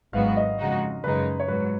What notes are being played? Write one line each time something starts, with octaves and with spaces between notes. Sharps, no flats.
G#1 G#2 F#3 B3 F#4 F5
D#5
F2 C#3 G#3 D#4 F#4
F#2 C#3 G#3 D#4 B4
C#5
G#2 F#3 B4